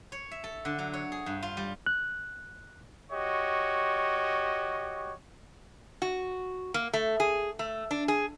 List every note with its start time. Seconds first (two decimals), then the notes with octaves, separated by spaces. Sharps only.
0.12 C#5
0.31 E5
0.44 A4
0.65 D3
0.79 F#3
0.93 C#5
1.12 G#4
1.26 G2
1.43 F4
1.57 G3
1.86 F#6
3.12 F#4 G4 C#5 D#5
6.02 F#4
6.74 A#3
6.93 A3
7.20 G#4
7.59 A3
7.91 D4
8.08 G#4